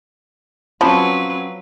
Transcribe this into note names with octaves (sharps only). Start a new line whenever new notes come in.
F3 F#3 C4 C#4 B4 B5